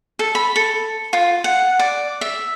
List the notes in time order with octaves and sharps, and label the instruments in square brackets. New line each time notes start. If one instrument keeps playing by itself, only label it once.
[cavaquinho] A4
B5
A4
F4
F#5
D5
E5